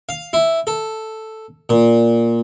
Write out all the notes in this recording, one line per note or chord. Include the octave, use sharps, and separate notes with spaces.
F5
E4
A4
A#2